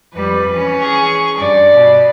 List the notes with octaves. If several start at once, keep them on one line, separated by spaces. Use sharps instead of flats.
F2 G3 B4
E3 C#4
G#4 C#6
G2 D5
B2